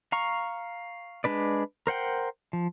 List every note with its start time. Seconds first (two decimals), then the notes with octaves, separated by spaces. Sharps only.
0.12 F5 A#5 C#6
1.24 G#3 D4 B4 D5
1.87 A#4 C5 F#5 G5
2.53 F3